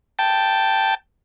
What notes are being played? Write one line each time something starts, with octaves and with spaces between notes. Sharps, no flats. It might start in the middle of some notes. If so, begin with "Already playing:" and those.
G5 A5